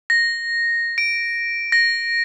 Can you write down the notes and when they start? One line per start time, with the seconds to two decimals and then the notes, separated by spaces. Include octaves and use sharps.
0.10 A#6
0.98 D7
1.72 A#6